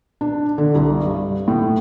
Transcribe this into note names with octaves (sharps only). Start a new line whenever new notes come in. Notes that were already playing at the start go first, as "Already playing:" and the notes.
D4
D3
C2
G2
A2